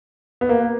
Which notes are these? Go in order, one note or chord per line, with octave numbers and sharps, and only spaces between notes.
B3
A#3